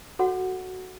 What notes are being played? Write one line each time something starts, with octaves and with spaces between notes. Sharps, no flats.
F#4 A4 C#5 F#5